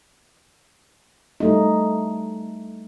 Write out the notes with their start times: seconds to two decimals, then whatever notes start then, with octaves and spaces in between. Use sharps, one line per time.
1.40 G3 A3 D#4